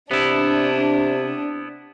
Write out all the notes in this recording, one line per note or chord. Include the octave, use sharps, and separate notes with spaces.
C3 B3 D4 E4